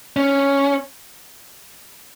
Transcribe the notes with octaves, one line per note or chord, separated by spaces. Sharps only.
C#4